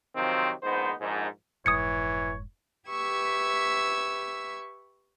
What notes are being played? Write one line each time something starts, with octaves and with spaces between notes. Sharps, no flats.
C3 D#3 F3 F#3 C4
A#1 G#2 B3 D#4 C5
A#1 G#2
F1 G#2 E3 C#5 D#6 G#6 C#7
G4 B4 E5 C#6 E6 G#6